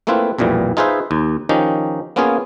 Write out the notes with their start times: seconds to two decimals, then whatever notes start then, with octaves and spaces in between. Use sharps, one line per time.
0.07 A3 A#3 C4 E4 F4 B4
0.39 B1 F2 A#2 E3 G3
0.77 D#4 F4 G#4 B4 C5 E5
1.11 D#2
1.49 D#3 F3 C#4 D#4 G4
2.16 A#3 B3 C#4 F4 G#4